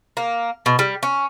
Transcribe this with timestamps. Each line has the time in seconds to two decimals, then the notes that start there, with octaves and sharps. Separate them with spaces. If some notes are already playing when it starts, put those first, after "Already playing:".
0.17 A#3
0.66 B2
0.79 G3
1.03 C#4